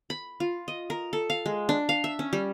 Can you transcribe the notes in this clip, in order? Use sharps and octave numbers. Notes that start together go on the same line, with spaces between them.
B5
F4
D#5
A#4
A4
F5
G#3
D4
F5
E5
C#4
G3